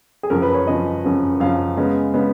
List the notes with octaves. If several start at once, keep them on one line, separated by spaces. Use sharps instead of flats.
G#4
F#2 C#3 F3 A#4
B4
C#5
F#2 C#3 F3 D#5
F#2 C#3 F3
F#2 C#3 F3 F5
C#3 G#3 B3
C#3 G#3 B3